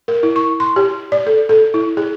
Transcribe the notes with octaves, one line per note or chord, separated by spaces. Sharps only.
A#4
E4
C#6
C6
G4
D5
A4
A4
E4
G#4